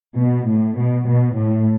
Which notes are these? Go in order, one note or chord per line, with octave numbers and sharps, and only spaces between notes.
B2
A2
B2
B2
A2